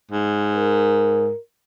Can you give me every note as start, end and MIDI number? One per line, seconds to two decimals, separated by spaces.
0.11 1.30 44
0.56 1.39 70